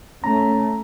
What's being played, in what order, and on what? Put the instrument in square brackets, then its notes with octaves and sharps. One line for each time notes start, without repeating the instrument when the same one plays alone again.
[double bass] A3 [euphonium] C#4 [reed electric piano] A#5